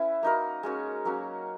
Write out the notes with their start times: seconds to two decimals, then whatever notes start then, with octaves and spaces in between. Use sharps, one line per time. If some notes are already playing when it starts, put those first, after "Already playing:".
Already playing: C#4 E4 B4 E5
0.23 A#3 D#4 F#4 A#4
0.63 G#3 C#4 F#4 A#4
1.05 F#3 A#3 C#4 F#4